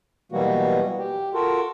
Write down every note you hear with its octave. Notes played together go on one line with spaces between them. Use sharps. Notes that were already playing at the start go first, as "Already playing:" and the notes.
B2 E3 F#3 G3 A#3 F#4
G4
F4 F#4 A4 A#4